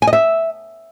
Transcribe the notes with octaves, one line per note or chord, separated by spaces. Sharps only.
G#5
D#5
E5